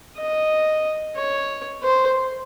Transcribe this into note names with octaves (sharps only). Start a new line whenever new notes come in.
D#5
C#5
C5